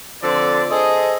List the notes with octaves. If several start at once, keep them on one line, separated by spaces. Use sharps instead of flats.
D3 F3 C4 A4 D5
G#4 A4 C5 D#5